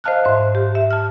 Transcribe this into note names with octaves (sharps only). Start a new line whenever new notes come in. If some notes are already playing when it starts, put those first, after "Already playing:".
C5 D#5 F5 A5 F6 F#6
G#2 C5 E5
G4
E5
A5 F6